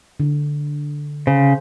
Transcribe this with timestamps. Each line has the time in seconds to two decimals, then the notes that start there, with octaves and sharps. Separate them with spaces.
0.20 D3
1.27 C#3 C5